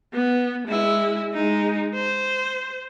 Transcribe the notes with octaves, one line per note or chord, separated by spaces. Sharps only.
B3
G#3 E4
G#3 D#4
C5